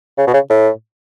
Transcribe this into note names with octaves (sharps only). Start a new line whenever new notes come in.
C#3
B2
C#3
A2